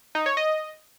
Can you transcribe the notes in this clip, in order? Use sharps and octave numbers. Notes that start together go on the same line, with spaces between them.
D#4
C#5
D#5